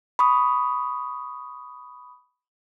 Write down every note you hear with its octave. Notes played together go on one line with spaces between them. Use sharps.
B5 C#6 D#6